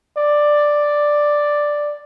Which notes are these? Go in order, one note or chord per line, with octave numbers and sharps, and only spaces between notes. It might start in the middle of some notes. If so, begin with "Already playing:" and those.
D5